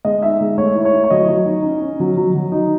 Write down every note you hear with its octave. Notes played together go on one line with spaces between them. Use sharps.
G#3 D#5
D#4 E5
G#3
A3 C#5
E4
C#5
E4
C#5
F#3 D#5
F#3
D#4
C#4
C#4
F#3
F#3
F#3
D#4